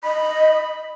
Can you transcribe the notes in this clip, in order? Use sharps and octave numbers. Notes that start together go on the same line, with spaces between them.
D#5 B5